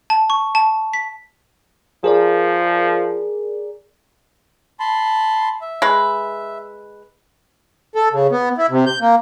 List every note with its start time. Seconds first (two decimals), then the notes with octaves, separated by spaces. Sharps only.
0.10 A5
0.30 C#6
0.55 A5
0.93 B6
2.04 F3 G#4 A#4 D5
4.80 A5 B5 C6
5.61 E5
5.82 G#3 B4
7.95 A4
8.13 C#3
8.31 B3
8.58 E4
8.70 C3
8.86 G6
9.01 A#3